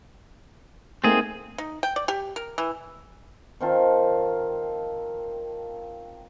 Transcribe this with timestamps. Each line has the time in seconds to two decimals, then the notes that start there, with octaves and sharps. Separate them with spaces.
1.04 A3 A#3 C4 D#4 G#4
1.58 D#4
1.83 G5
1.96 D5
2.08 G4
2.36 A#4
2.58 E3
3.61 D#3 C4 F4 A5